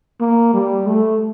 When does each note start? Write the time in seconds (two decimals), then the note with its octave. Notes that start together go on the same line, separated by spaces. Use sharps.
0.20 A#3
0.54 G3
0.87 A3